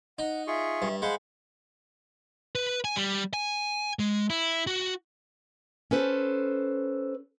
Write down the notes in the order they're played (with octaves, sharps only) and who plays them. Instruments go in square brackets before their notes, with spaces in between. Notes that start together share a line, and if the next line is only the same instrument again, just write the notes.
[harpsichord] D#4 [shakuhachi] F#5
[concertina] F4 G#4 C#6 [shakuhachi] E5
[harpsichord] G2
[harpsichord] G#3 [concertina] C5 F#5 B5 [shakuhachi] F5
[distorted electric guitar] B4
G#5
G3
G#5
G#3
E4
F#4
[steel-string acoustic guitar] C#4 A4 B4 C5